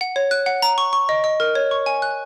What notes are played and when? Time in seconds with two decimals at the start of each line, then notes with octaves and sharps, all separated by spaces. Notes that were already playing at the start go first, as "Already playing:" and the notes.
0.01 F#5
0.16 C#5
0.31 F#6
0.46 F#5
0.62 A#5
0.78 C#6
0.93 C#6
1.09 D#5
1.24 D#5
1.40 A#4
1.55 C#5
1.71 C#6
1.86 G#5
2.02 F#6